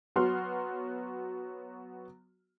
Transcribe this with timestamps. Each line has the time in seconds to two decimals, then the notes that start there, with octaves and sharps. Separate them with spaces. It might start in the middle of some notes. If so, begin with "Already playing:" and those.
0.16 F#3 B3 F#4 C6 F6